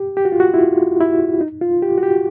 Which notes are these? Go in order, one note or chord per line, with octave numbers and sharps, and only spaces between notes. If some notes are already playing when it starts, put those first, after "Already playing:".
Already playing: G4
G4
F#4
F4
F#4
E4
F4
E4
D#4
F4
G4
F#4
G4